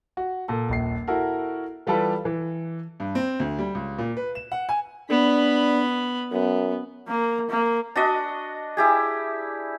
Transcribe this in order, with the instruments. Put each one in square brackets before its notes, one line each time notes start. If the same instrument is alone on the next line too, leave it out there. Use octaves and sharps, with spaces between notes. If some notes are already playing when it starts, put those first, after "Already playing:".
[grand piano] F#4
A#2 A4
D#1 A#1 C7
E4 F#4 A4 A#4
E3 G3 F4 G4 A4 B4
E3
G2
C4
D2
G3
C#2
A#2
B4
E7
F#5
G#5
[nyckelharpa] B3 B5 [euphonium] D4
[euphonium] F#2 [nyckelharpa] B3
[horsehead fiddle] A#3
A#3
[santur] D4 F#4 D#5
E4 G4 G#4